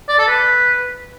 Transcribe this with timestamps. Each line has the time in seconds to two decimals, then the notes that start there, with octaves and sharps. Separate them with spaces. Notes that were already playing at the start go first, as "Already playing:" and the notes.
0.09 D5
0.18 A4
0.28 B4